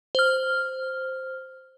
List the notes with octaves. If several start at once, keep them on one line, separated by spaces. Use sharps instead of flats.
C5 F6